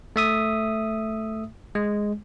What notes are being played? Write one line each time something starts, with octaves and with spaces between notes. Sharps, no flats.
A3 E5 D#6
G#3